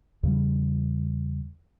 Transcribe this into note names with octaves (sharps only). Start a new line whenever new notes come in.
E2 C#3 G3